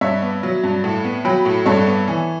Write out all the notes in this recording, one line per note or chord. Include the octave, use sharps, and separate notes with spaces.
G2 C#5 E5
B3
F#3
G2
A2
B3
F#3 G5 B5
A2
G2 A4 C#5
B3
E3